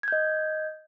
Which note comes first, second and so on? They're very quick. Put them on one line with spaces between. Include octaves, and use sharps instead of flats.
G#6 G6 D#5